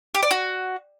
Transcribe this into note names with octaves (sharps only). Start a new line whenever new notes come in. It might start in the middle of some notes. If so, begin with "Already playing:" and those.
G4
D5
F#4